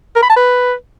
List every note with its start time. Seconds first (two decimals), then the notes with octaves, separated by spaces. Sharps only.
0.16 A#4
0.23 B5
0.29 A5
0.36 B4